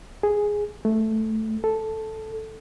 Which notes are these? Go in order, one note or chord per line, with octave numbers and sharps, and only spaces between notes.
G#4
A3
A4